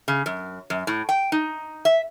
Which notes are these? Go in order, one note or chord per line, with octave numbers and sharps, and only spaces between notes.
C#3
F#2
F#2
A2
G5
D#4
E5